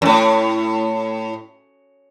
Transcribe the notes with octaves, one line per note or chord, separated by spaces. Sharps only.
F#2 A2